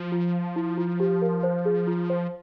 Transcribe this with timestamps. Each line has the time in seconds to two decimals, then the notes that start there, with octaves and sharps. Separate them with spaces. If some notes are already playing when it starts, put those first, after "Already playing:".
Already playing: F3
0.12 F4
0.56 E4
0.78 F4
1.00 G4
1.22 A#4
1.43 C5
1.66 G#4
1.87 F4
2.10 C5